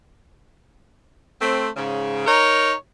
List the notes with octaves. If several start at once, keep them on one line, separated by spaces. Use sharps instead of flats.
A3 C4
G#2 C#3
D#4 A#4 C#5